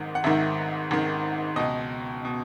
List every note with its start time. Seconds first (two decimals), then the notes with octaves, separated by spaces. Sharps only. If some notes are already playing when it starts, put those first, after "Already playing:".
Already playing: G#1 G#2 D#3
0.15 F#5
0.24 G#1 G#2 D#3 E5
0.91 G#1 G#2 D#3
1.56 C#2 B2 D#5
2.25 B2